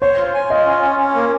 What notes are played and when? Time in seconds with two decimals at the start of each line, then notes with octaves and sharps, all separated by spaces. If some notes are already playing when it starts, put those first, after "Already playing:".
0.02 C5 C#5
0.18 F4
0.34 G#5
0.50 F4 D#5
0.66 C#4
0.82 C#4
0.99 C#4
1.15 A#3